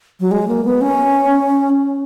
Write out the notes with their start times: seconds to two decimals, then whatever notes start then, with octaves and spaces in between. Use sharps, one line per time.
0.20 F#3
0.31 G#3
0.48 A#3
0.65 B3
0.81 C#4